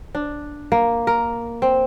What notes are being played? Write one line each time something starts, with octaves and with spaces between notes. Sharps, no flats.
D4
A#3
A#4
C4